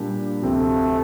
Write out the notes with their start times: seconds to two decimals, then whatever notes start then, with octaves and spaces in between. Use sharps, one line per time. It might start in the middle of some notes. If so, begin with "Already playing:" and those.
Already playing: A#2 G3 D4 G4
0.42 D2 C3 F3 A3 C4